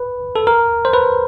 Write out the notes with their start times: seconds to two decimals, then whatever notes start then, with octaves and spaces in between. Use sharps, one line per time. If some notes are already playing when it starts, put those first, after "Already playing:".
Already playing: B4
0.36 A4
0.47 A#4
0.85 C5
0.93 B4